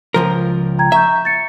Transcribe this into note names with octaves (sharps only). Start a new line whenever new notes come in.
C#2 F3 A#4
G5 A#5 G#6
E5 A#5 C#6 G6
A6 C#7